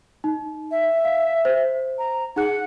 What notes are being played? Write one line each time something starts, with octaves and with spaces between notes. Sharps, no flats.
D#4
E5
F5
C5
A#5
D#4 G#4 F#5 F#6